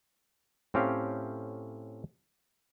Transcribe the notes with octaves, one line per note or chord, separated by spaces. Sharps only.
A2 C4 C#4 G4 F5